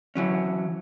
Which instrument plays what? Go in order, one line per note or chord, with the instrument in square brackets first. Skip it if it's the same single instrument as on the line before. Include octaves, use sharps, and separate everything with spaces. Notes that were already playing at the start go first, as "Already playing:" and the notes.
[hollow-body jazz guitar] E3 F#3 C#4